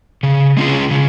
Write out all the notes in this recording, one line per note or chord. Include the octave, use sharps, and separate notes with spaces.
C#3
G#3 C#4 F4 G#4
C#3